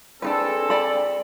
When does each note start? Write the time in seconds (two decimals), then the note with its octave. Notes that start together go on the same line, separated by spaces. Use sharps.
0.22 C4 D4 D#4 G#4 A4 B4
0.70 D5 B5